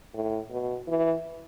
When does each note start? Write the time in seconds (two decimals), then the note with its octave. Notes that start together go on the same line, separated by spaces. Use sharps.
0.14 A2
0.51 B2
0.87 E3